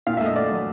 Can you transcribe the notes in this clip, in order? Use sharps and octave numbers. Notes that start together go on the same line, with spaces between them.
A#2 F5
A3 E5
D#5
A3 D5
F#3